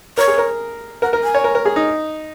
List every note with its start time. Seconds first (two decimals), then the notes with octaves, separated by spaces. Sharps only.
0.18 A#4 C#5
0.28 G#4
0.38 A#4
1.02 A#4 F#5
1.13 A#4
1.24 G#5
1.35 C#5
1.44 A#4
1.55 A#4
1.65 G#4
1.76 D#4